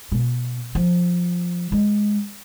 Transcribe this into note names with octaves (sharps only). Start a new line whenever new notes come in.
B2
F3
G#3